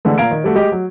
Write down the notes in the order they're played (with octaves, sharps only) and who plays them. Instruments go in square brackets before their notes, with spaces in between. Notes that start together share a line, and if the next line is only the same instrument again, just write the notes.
[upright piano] D3 E3 G#3 A3
A#2 F5 A#5 G#6 D7
D#3
G3 A3 F#4
G#3 G4 D#5
F#3